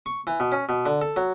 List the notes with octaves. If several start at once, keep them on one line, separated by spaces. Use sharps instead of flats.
C#6
E3
B2
C#4
B2
D3
A4
F#3